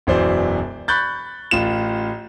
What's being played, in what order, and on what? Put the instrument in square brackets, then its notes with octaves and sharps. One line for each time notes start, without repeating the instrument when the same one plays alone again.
[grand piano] E1 F#2 E3 C5 D5
B5 C#6 F#6 G6 A6
A1 F4 E7